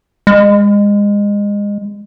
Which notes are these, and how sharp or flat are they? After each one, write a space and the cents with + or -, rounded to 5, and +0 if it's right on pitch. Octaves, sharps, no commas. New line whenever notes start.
G#3 -25